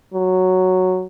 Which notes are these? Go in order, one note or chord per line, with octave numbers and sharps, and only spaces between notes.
F#3